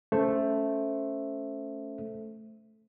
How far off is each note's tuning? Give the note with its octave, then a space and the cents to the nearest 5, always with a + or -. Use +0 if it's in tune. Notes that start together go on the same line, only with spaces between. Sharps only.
A3 +0 C#4 +10 C5 +0